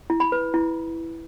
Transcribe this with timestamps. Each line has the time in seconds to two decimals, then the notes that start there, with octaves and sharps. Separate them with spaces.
0.10 E4
0.20 B5
0.32 B4
0.54 E4